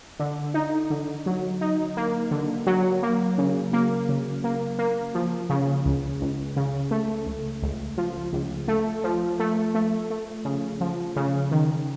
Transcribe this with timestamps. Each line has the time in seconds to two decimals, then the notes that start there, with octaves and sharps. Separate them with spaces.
0.19 D3
0.54 D#4
0.90 D3
1.26 F#3
1.61 D#4
1.97 A#3
2.31 D3
2.67 F#3
3.03 A#3
3.38 C#3
3.73 A#3
4.09 C#3
4.44 A#3
4.79 A#3
5.15 F3
5.50 C#3
5.86 C#2
6.21 C#2
6.56 C#3
6.91 A3
7.26 C#2
7.62 C#2
7.98 F3
8.33 C#2
8.68 A3
9.04 F3
9.40 A3
9.75 A3
10.10 A3
10.45 C#3
10.81 F3
11.16 C#3
11.51 D#3